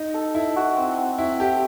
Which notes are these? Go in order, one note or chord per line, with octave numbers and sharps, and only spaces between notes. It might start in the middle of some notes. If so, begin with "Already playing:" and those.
Already playing: D#4
A4
E4 A4
F#4
C4
C4
C4 E4
G4 A4